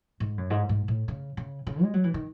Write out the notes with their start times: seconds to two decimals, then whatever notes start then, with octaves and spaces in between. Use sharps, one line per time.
0.20 G#2
0.38 F#2
0.50 G#2
0.69 G#2
0.88 A2
1.08 C#3
1.37 C#3
1.67 C#3
1.82 G#3
1.94 F#3
2.04 E3
2.14 D#3